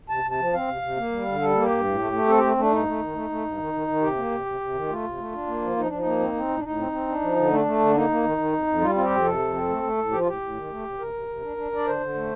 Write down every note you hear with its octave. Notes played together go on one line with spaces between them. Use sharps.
C3 A5
C3
A5
F3
C4 F5
C3
C3
A#3
G3
D3
G3 A4
A#3
G4
G2
A2
A3
A3
C4 A4
A3 G4
A3 D4
G2 D#4
A3
D#3
A3
A3
G2
D#3
D#3
D#3
C3 G4
A#3
C3
C3
C3
D#3
A3 F4
C3
A3
D4
A#3
F3
F3 D#4
F3 D4
D#4
A#3
C4
C4
A2
D4
A2 D#4
C4
C4
D4
F3
D3
A3 D4
A3
D3
A#3 D#4
A#3
D#3
D#3
F2
F2
G3 F4
C4 F4
G4
F2
C3 A4
F2
C4
A3
A3
A2
F3 G4
F4
A2 G4
A2
D#3
A3
C3
C3 A#4
C3
C3
D4
D4
D4 D5
D3 C5
D3
A3